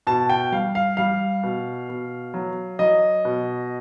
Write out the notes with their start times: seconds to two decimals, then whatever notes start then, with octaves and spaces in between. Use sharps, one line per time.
0.07 B2 A5
0.29 G5
0.52 G3 F5
0.75 F5
0.97 G3 F5
1.43 B2
1.89 B2
2.34 F#3
2.79 F#3 D#5
3.25 B2